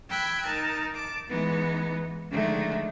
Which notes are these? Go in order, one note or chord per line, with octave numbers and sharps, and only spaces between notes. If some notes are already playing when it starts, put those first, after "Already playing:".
G5 B5 E6 F#6 G#6
D#4 A#4 A5
A5 D6
E3 G#3 B3 D#4
D3 D#3 F3 G#3 A3 D#4